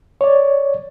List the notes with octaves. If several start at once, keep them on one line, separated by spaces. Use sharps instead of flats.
C#5 D5